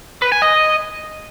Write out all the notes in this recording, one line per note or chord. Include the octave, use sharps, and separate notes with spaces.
B4
G#5
D#5